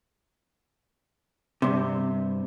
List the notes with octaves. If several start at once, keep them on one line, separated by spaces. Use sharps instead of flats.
G2 C3